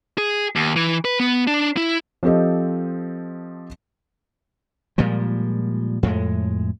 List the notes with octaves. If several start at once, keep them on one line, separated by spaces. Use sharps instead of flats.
G#4
D#2
E3
B4
B3
D4
E4
F3 C4 G4 A4 D#5
A#2 F3 G3 G#3
F2 A2 G#3